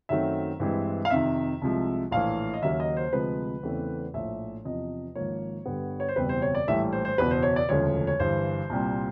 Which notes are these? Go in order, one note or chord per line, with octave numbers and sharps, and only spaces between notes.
F#2 D#3 F#3 A3 C4 E5
G2 E3 G#3 C4
F5
F2 C3 D#3 E5
C2 C3 F3 G#3
A#1 A2 E3 F5
D#5
D#2 C#3 F#3 A#3 E5
D#5
C5
D2 C3 F3 G#3 B4
E2 C#3 E3 A3 C4
A#1 A2 F3 E5
E2 C3 F3 D#5
G#1 G#2 F3 A#3 C#5
G2 D3 G3 B3
C#5
C5
F#1 E2 B2 G3 C4 B4
C5
C#5
D5
A#1 A2 E3 G3 E5
C5
C5
F#1 E2 B2 B4
C5
C#5
D5
E1 D2 C#3 F3 A3 C#5
C#5
G1 G2 E3 C5
C2 A#2 G3 C4